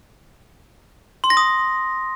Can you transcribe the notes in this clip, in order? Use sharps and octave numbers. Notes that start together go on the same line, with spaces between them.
C6
A#6
D#6